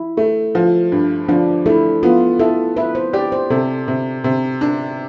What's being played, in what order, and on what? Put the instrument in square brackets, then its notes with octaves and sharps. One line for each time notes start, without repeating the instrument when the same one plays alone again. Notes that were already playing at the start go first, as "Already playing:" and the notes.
Already playing: [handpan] E4
[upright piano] A3
F3
G2
[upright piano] F3 [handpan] D4
[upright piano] A3 [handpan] E4
[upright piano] B3 [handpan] F4
[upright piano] E4 [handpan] A4
[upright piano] E4 [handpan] B4
[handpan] C5
[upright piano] G4 [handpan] D5
[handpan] C5
[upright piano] C3 [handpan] A4
[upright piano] C3
C3
D4